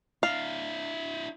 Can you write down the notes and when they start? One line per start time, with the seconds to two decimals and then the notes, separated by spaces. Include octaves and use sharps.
0.23 D4 E4 F5